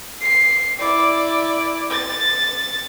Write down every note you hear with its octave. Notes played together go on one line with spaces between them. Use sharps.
C7
E4 D5
A6